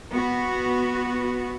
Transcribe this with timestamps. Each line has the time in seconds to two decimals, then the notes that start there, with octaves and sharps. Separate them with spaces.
0.13 B3 F#4